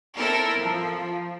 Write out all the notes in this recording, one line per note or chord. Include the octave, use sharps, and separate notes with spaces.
C4 E4 A4 A#4
F3